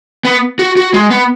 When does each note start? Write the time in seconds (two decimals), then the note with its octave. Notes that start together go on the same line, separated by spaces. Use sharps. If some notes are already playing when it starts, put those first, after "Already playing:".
0.25 B3
0.59 F#4
0.77 F#4
0.94 G#3
1.10 B3